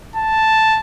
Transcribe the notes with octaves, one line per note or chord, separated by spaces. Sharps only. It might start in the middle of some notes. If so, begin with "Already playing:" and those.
A5